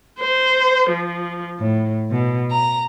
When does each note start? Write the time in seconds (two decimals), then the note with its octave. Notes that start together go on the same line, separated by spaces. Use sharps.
0.20 C5
0.90 F3
1.59 A2
2.11 B2
2.50 A#5